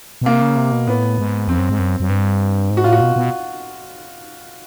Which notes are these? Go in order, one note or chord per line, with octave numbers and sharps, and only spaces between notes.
B2
C3 A#3
C#3
C3
B2
A2 B3
G#2
F2 C4
F#2
G#2
F#2
F#2
G2
G#2
F#4
A2 F4
F#4
B2
B2